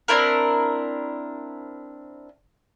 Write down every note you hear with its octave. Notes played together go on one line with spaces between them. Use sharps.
C4 D4 E4 A#4